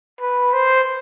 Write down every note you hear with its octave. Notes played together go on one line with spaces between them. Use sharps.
B4
C5